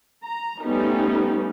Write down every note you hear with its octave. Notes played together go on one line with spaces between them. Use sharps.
A#5
G3 A3 B3 C#4 D#4